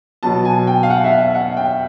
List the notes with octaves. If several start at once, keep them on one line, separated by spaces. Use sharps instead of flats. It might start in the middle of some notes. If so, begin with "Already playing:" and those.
B2 F#3 B3 A5
G#5
G5
F5
F#5
E5
F5
F#5
G5